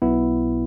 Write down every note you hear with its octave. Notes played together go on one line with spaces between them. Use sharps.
B1 B2 B3 E4